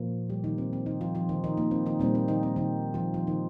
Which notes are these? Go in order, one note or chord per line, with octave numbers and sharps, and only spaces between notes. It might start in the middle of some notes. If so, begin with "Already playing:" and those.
Already playing: A#2 F3 A#3
G3 G4
D#3 D#4
C4
C4
D#3 D#4
F3 F4
F3 F4
D#3 D#4
D#3 D#4
A#3
C4
D#3 D#4
A#2 G3 A#3 C4
C4
D#3 D#4
C4
D#3 D#4
F3 F4
F3 F4
D#3 D#4